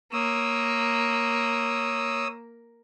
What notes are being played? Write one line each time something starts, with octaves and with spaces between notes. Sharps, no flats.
A#3 C#5 D#6 E6